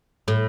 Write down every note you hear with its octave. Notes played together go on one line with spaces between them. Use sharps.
A2